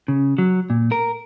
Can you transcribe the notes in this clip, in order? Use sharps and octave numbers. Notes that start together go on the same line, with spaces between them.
C#3
F#3
A#2
A#4